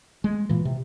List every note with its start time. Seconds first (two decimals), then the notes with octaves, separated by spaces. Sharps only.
0.24 G#3
0.49 A#2 E3
0.65 C3